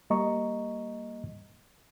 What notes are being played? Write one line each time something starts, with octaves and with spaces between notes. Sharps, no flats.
G3 A#3 D#5 A#5 C#6